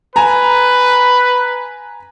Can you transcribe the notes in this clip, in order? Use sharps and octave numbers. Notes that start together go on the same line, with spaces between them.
B4 G#5 A#5